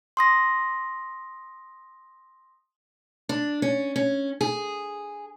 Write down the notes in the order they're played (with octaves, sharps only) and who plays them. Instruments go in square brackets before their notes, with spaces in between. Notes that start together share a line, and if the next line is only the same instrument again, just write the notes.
[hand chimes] C6 D#6 A#6
[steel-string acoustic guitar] D4
C#4
C#4
G#4